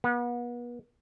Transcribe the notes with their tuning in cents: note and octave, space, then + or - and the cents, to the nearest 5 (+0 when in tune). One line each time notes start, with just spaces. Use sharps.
B3 -35